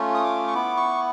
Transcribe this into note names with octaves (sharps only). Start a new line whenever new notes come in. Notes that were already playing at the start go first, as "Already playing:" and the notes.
Already playing: A3 C#4 F4
D#6
D6
C#6
B3 E4 D6
C#6